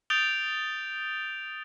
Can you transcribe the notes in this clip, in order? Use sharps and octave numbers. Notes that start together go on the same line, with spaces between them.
D#6 G6 A6 D7 F7 G7